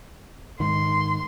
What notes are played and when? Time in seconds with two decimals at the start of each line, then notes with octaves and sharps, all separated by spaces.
0.60 G#2 D#3 C6